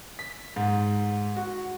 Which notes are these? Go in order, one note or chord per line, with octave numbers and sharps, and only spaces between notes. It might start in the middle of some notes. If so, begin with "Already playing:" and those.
B6
G#2
F#4